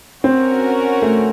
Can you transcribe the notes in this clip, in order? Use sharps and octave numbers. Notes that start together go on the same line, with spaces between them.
C4 C#4 F#4 A#4
A3